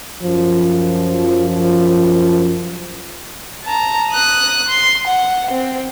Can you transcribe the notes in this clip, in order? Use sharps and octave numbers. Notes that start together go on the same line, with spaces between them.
F#2 F3
A5 A#5
D#6 F#6
C6
F#5
C4